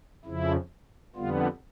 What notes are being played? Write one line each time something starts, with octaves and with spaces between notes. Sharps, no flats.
F2 C#3 F3 E4
F2 D3 G3 B3 F4